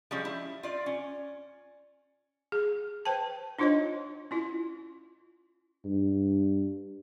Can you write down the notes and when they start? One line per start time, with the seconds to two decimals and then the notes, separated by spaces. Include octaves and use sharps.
0.11 F3 G3 G#3 C#4
0.25 E4
0.63 F4 D5
0.86 C#4
2.52 G#4
3.05 B4 C5 G5 A5
3.59 D4 D#4 F4 C5 C#5 D#5
4.31 C#4 E4 F4
5.85 G2